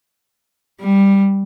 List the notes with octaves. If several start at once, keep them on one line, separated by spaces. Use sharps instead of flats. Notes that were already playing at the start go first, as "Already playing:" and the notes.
G3